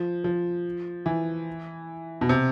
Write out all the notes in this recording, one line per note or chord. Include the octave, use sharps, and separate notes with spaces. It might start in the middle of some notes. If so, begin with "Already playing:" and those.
Already playing: F3
F3
E3
B2
C3